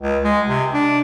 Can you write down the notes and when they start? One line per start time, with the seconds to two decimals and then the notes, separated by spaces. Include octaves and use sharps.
0.01 C#2
0.24 G#3
0.47 C3
0.74 D4